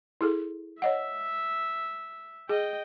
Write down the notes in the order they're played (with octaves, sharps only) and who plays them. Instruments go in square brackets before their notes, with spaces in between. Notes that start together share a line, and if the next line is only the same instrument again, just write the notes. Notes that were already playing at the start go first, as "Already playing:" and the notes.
[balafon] E4 G#4 A4
[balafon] C#5 D#5 F#5 [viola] E5
[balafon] G#4 [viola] D#5 G5